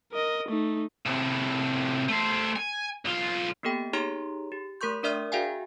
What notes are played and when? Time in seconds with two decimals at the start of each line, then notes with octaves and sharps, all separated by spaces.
0.12 A#4 D#5
0.48 A3 D#4
1.06 A2 C3
2.08 A3 C5
2.56 G#5
3.05 B1 F4
3.63 A#3 B3 G4 A4 G5
3.93 D#4 G4 G#4 C#5 A#5 C6
4.52 G4
4.81 A3 A#4 C6 C#6 G6
5.03 D4 A#4 D5 E5 D#6 F6
5.32 F#4 G#4 E5 F5 G5 G#5